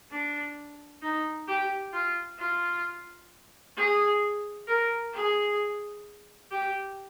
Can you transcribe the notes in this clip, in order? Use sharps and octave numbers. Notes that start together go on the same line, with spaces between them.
D4
D#4
G4
F4
F4
G#4
A#4
G#4
G4